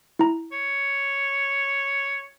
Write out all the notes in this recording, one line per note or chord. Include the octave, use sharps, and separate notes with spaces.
E4 A#5
C#5